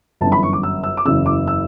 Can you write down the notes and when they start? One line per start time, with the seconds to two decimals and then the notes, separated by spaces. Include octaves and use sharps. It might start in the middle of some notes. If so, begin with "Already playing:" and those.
0.21 G1 A5
0.24 F#2 E3
0.32 B5
0.43 C#6
0.53 D6
0.63 E6
0.84 E6
0.97 D6
1.05 F#1 E2 C#3 E6
1.26 D6
1.47 E6